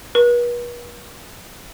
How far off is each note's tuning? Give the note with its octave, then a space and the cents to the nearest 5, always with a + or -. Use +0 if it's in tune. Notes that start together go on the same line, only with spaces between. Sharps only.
B4 -45